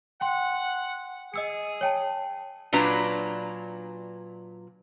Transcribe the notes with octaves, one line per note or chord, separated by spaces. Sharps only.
F#5 G5 C6
G#4 D#5 E6 C#7
C#5 G5 A5
A#2 F#3 D4 B4 A#5